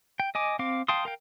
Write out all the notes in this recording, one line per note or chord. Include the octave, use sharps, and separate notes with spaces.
G5
D#5 G#5 D6
C4 F5 D6
F5 G5 A5 C6 D#6
A#4 F5 G5